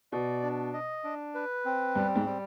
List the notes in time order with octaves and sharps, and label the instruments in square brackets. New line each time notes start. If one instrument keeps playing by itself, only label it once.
[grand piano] B2 [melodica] D5
[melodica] D4
D#5
D4
B4
C4
[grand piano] G2 [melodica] G3
[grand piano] G#2
[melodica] G3